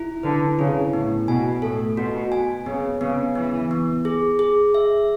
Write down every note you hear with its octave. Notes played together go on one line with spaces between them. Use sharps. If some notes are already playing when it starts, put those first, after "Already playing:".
Already playing: E4
D3 B4
C#3 E4
A2 B3
B2 G#5
A2 A4
B2 F#4
G#5
C#3 B3
C#3 B3
E3 B3
B3
G#4
G#4
E5